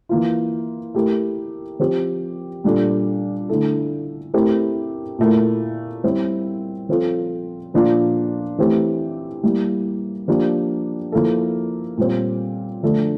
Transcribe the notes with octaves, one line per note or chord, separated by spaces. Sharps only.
E3 A#3 F4
A3 E4 G4 A#4
F3 C4 G4
A#2 G3 D4 A4
D3 A3 E4 A4
A3 C4 E4 G4 A#4
A#2 A3 E4 A#4
G3 C4 E4
F3 C4 F4 A4
A#2 F3 A#3 D4 F4
E3 A3 C4 G4
G3 A#3 E4
F3 A#3 D4 G4
F3 A#3 E4 A4
A#2 G3 C4
D3 F3 A3 D4 A4